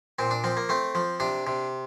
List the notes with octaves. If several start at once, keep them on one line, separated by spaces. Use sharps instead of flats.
A#2 C4
D4
F3 C4
A#3
A3 C4
F3
C3 D4
C3